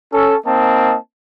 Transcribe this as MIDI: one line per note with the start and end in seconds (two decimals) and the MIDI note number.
0.13 0.35 61
0.13 0.35 69
0.46 0.97 58
0.46 0.97 60
0.46 0.97 63
0.46 0.97 75
0.46 0.97 81